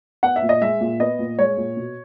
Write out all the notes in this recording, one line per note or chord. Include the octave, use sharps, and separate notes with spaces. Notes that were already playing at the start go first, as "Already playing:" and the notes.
B3 F#5
E5
A#2
D#5
G#3 E5
A#2
B3 D#5
A#2
G#3 C#5
A#2
B2